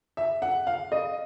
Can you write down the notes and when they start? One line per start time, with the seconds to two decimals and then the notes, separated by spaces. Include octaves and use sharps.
0.17 E5
0.42 F#5
0.67 F5
0.92 D#5